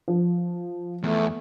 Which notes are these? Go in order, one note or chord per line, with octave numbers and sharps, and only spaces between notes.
F3
E2 A3